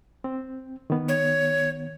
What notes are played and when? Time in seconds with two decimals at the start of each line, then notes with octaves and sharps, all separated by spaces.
0.24 C4
0.90 D#3 B3
1.09 C#5